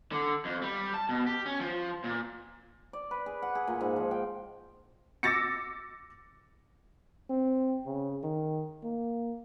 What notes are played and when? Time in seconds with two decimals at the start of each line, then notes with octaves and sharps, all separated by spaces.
0.12 D3
0.45 F2
0.62 G3
0.94 A5
1.09 B2
1.27 G4
1.46 C#4
1.60 F3
2.04 A#2
2.93 D5
3.11 B4
3.26 G#4
3.42 F#5
3.55 G#4
3.67 A#2
3.81 G#2
3.96 F3
4.11 G5
5.23 D6 E6 A6 A#6 C#7
7.30 C4
7.86 C#3
8.23 D#3
8.83 A#3